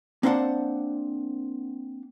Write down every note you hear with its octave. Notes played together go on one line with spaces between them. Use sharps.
A#3 C4 D4 C5 F#5 A5